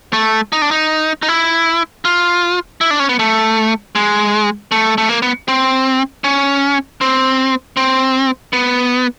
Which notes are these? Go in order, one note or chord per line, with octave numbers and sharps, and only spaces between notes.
A3
D#4
D4
D#4
D#4
E4
F4
E4
D4
C#4
B3
A3
G#3
A3
A3
A#3
B3
C4
C#4
C4
C4
B3